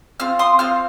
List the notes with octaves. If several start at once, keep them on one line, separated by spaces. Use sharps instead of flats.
C4 F4 F6
C6 D#6
C4 F4 F6